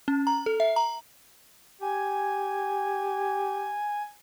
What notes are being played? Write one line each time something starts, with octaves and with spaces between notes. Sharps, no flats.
C#4
A#5
A4
E5
A#5
G4 G#5